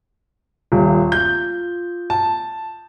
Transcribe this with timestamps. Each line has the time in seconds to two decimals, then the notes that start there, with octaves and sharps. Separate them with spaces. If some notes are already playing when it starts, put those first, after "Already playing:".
0.72 D#1 F4
1.12 G6
2.10 A5